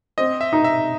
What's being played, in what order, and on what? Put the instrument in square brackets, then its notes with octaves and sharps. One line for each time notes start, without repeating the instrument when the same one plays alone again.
[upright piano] C4 [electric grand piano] D#5
[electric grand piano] E5
[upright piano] D#4
[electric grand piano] E5